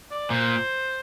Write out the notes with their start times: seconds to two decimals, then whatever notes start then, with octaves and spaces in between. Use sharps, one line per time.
0.11 D5
0.30 A#2 C5